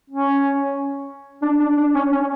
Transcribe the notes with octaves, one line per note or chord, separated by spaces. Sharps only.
C#4
D4
D4
D4
C#4
C#4